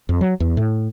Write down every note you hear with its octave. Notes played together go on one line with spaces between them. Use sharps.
F2
F#3
E2
A2